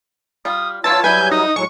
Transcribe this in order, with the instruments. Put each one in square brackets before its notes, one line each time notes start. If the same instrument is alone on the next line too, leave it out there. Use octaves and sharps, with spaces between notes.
[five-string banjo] G3 F4 [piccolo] D#6
[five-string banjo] E3 F#3 D4 [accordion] F4 C#5 [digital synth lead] A5 [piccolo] E6
[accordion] F#3 G3 [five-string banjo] E4 G#4 B4 [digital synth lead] G#5 [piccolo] G6
[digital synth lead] D#4 [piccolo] D#6
[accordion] A2 F#3 [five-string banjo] G#3 [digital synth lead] C#6